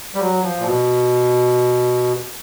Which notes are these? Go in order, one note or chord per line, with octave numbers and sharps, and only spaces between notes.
G3
F#3
F3
A#2
B2